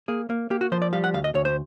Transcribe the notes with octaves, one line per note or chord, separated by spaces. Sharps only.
A#3 G#4
A#3
A#3 G4
F#4
F3 C5
D5
G3 F5
F#5
D2 F5
D#5
D2 C#5
C5